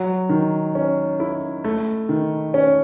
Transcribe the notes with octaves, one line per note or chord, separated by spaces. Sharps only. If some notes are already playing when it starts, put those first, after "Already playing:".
Already playing: F#3
D#3
C#4
E4
A3
D#3
C#4